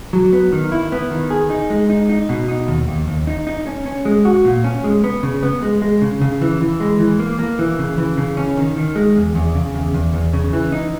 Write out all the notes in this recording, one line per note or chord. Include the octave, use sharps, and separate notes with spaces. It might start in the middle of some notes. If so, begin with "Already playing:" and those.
F#3
B3
D#3
E4
B3
D#3
G#4
D#4
G#3
D#4
D#4
B2
D#4
D#2
D#2
D#2
D#4
D#4
C#4
C#4
G#3
F#4
A#2
C#4
G#3
B3
C#3
B3
G#3
G#3
C#3
C#3
E3
E3
G#3
E3
A#3
A#3
E3
C#3
E3
C#3
C#4
D#3
D#3
G#3
E2
E2
C#3
E2
E2
E2
C#3
E3
D#4